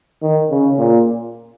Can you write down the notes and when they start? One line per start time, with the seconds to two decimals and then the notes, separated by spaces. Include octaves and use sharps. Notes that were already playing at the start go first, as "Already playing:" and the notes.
0.22 D#3
0.50 C#3
0.78 A#2